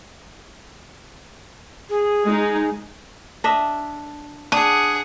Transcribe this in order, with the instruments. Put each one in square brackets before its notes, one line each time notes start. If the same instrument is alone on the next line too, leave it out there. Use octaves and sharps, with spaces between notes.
[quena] G#4
[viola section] G#3 D#4
[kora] D4 D#5 E5
[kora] D4 [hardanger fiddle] G#4 F#5 [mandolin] D#6